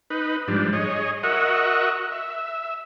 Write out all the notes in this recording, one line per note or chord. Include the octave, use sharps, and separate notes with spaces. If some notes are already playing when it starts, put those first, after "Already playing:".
D#4 B4
G#2 F3 G3 D4
G#4 C#5 D#5
F#4 A#4 D#5 E5 F#5 C#6
E5